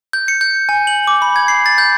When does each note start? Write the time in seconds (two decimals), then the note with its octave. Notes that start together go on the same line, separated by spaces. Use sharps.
0.13 G6
0.28 C#7
0.41 G6
0.69 G#5
0.87 F#7
1.07 D6
1.22 B5
1.36 G#6
1.48 C7
1.66 A6
1.78 G6